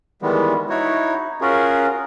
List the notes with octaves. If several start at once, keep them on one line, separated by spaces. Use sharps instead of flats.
D#3 E3 G3 G#3 B3
D#4 E4 F#4 C#5
C#4 F4 F#4 G#4 A#4